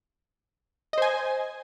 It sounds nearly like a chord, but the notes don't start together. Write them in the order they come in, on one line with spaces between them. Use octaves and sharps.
D#5 C5 G#5